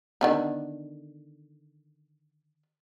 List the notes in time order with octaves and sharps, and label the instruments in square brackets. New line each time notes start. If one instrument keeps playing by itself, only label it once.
[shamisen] D3 D#3 B3